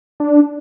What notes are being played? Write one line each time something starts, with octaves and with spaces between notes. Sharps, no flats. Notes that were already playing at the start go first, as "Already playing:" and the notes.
D4